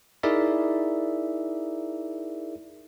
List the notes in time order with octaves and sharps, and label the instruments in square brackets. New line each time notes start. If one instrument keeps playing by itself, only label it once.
[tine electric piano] D#4 E4 G#4 A#4 D5 E5